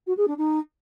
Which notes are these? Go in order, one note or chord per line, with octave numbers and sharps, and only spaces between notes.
F#4
G#4
D4
D#4